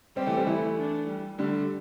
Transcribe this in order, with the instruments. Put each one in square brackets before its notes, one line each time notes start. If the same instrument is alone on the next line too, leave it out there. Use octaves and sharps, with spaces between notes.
[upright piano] G3 C4 [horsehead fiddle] G4
[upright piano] E3 A3
G3 C4
[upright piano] E3 A3 [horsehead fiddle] E4
[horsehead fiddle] D4
G3
[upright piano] D3 G3 [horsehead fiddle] A3